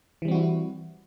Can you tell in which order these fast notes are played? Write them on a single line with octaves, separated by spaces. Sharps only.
E3 G3 C4 F#4 E4